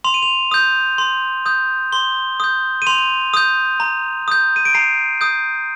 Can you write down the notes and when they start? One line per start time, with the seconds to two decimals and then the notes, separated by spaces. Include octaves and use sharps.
0.04 C6 F7
0.14 D#7
0.23 F7
0.51 D#6 G6
0.98 C6
1.46 D#6 G6
1.92 C6 G7
2.40 D#6 G6
2.82 D#7
2.87 C6 F7
3.34 D#6 G6
3.80 A#5
4.28 D#6 G6
4.56 D#7
4.65 D7
4.74 A#5 C7
5.21 D#6 G6